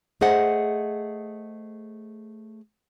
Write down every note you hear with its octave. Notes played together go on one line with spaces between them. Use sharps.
A3 G#4 C5 D#5 F#5